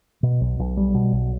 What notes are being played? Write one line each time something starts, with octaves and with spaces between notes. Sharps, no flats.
B2
B1
B1
G3
B2
B1